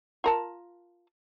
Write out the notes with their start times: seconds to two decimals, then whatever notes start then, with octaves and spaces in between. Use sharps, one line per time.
0.24 F4 A#4 A5